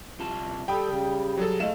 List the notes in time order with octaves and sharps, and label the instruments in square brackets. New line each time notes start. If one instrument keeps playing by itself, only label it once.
[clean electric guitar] C2 F4 A5
[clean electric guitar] G3 [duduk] A4 [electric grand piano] G5 B5 D#6
[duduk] C#3
[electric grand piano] F#3 G#4 A4
[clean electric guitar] A2 [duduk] G#3 [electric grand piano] A3 F5 E7